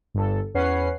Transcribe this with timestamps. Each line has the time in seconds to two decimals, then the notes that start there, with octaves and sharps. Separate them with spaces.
0.14 G1 A4
0.54 E2 C#4 B4 F#5 C7